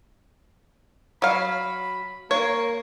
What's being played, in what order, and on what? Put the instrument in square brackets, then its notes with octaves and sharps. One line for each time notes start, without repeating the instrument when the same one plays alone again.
[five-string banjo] F#3 F5 [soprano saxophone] B5
[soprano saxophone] A#3 [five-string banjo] C#5